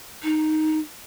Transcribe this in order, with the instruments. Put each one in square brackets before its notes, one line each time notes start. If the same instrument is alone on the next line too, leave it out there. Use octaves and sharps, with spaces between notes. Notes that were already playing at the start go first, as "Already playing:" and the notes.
[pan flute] D#4